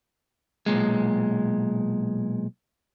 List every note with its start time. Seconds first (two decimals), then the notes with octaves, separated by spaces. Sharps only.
0.66 B1 A#2 G#3